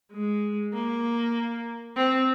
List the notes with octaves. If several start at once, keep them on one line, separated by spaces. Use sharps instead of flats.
G#3
A#3
C4